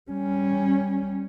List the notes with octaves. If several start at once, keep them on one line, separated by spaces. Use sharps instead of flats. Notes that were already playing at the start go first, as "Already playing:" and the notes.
G3 C#4